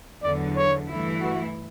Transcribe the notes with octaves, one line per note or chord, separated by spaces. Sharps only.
E2 D3 F#3 D5
C#5
G2 E3 A3 E4
F#4